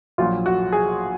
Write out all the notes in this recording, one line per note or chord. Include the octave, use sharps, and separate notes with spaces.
A#1 A#2 F#3 F4
F#4
G#4